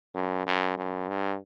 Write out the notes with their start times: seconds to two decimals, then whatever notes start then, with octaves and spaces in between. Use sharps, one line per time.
0.15 F#2
0.46 F#2
0.77 F#2
1.08 G2